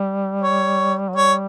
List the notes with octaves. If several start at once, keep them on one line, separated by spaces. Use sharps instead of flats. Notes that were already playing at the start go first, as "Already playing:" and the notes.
Already playing: G3
C#5
F#3
G3 C#5